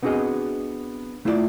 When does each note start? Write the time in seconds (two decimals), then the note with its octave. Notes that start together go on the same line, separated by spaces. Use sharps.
0.03 B3 C4 D4 F#4 G#4 D#5
1.25 A3 E4 F4 A4 D5 E5